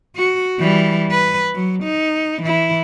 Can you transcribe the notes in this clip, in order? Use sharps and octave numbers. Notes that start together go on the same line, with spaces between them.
F#4
E3 G3
B4
F#3
D#4
E3 E4